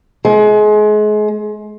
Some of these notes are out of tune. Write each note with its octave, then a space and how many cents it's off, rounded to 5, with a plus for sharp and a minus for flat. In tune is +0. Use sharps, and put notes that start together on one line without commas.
G#3 +30